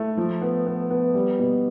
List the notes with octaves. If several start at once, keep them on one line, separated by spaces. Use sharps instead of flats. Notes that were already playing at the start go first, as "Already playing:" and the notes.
Already playing: A3 E4
F3
B3
B3
B3
G3
B2